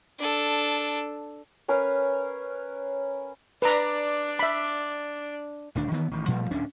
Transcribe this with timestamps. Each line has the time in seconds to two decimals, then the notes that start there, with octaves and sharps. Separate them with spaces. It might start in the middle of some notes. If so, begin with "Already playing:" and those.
0.19 D4 A4
1.68 C#4 A#4 B4 F5
3.62 D4 B4 D5 A#5
4.39 E5 B5
5.75 D#1 D2 D4
5.91 D#3 E3 B3
6.11 A1 D#3
6.28 A#2 F3 G3 A3
6.51 D1 C#4 D4